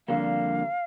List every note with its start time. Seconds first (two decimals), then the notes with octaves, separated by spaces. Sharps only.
0.08 F2 D3 G3 A#3 F5